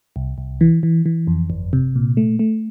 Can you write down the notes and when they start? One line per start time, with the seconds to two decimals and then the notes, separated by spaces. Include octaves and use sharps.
0.16 C2
0.38 C2
0.61 E3
0.83 E3
1.06 E3
1.27 F2
1.50 G1
1.73 C3
1.96 A#2
2.17 A3
2.39 A3